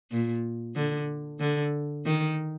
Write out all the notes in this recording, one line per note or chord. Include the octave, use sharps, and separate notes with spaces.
A#2
D3
D3
D#3